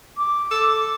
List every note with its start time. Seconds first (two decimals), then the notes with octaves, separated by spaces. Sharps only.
0.17 D6
0.51 A4